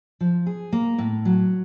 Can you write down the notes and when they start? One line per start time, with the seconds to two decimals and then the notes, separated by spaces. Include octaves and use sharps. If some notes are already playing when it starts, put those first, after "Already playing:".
0.21 F3
0.47 G#4
0.73 A#3
0.98 A2
1.25 F#3